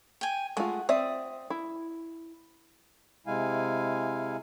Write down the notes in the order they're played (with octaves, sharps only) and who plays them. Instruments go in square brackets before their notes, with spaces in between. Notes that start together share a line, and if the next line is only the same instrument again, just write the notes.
[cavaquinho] G5 G#5
[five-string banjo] G#3 A3 F4 [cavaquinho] F#5
[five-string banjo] C4 D5 E5 [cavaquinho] D#6
[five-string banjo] E4
[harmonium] C3 G#3 E4 F5 G#5